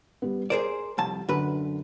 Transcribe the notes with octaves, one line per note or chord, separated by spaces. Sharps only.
G3 B3
G#4 A#4 C5 D5
C2 F2 A5
F#2 D3 B4